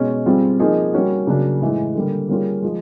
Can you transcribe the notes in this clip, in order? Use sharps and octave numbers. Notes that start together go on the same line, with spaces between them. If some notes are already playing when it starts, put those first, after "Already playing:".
Already playing: B2 G#3 C#4
G3 C4 F4 G#4
F3 A#3 D#4 G#4
G3 A#3 C#4 F#4
C#3 F#3 A#3 D4
A2 E3 G#3
D3 G3 A#3
G3 A#3 C#4 F4 G#4
F3 G#3